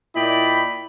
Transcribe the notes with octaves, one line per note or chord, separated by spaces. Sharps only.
A#2 E4 D5 D#5 G5 B5